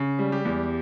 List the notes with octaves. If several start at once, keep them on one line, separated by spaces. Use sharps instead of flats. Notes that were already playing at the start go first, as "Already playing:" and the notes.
Already playing: C#3
G3
G4
E2